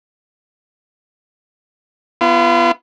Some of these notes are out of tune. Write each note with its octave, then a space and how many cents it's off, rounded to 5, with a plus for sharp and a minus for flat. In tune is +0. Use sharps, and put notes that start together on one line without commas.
B3 +0 F4 -40